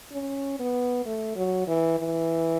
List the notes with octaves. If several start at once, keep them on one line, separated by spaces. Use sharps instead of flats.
C#4
B3
A3
F#3
E3
E3